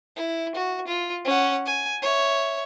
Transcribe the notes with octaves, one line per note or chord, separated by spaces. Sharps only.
E4
F#4
F4
C#4 F#5
G#5
C#5 E5